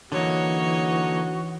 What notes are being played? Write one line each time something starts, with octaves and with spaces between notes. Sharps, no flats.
D3 E3 F#3 A#3 D#4 F#4 C#5